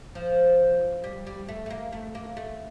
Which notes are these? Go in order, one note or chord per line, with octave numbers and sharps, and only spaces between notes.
F3
G3
G3
A3
A3
A#3
A3
A#3
A3